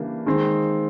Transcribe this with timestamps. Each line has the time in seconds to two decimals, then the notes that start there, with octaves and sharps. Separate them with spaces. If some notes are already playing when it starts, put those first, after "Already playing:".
Already playing: C#3 E3 G3 A#3 D4
0.26 D#3 G#3 C4